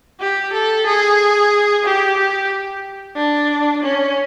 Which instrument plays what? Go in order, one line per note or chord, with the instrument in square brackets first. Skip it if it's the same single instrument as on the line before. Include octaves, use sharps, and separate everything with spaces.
[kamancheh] G4
A4
G#4
G4
G4
D4
C#4